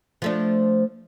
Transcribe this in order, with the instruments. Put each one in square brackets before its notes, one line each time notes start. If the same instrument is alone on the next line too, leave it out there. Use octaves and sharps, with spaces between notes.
[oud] F3 A3 D4